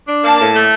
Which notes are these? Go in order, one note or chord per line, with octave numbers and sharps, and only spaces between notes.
D4
A#3 A5
A2
A3